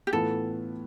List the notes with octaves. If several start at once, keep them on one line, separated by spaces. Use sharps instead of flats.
G4
A2 E3 B3 F4 A4